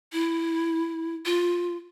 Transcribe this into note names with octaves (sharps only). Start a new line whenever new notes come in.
E4
F4